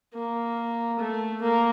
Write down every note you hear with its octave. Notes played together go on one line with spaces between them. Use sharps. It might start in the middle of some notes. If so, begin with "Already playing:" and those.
A#3
A3
A#3